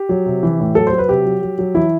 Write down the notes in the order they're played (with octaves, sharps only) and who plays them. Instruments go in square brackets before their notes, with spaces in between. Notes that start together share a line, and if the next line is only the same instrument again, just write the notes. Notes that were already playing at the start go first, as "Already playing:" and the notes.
Already playing: [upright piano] G4
F#3
C3
E3
A2
F#3 A4
C5
F#3
B4
C3 G4
F#3
F#3
F#3
E3 E4